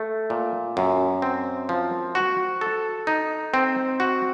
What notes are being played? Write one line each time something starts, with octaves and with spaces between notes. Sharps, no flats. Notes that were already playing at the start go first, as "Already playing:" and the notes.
Already playing: A3
A#2
F#2
C4
F3
F#4
A4
D#4
C4
F#4